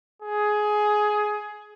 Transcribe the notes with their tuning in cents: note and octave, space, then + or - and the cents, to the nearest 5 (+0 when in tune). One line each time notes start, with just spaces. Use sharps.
G#4 +15